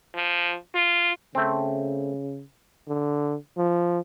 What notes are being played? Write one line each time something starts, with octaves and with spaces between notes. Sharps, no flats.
F3
F4
C#3 A3 C4
D3
F3